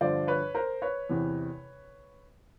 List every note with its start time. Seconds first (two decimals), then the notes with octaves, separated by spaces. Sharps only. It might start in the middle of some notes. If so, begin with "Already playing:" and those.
0.01 G2 D3 F3 C5 D5
0.27 B4 C#5
0.55 A#4 C5
0.82 B4 C#5
1.09 E2 C3 E3